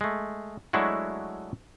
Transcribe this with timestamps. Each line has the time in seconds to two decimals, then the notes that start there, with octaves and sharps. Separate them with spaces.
0.01 G#3 A3
0.73 F#3 G#3 A3 D4 E4 F#4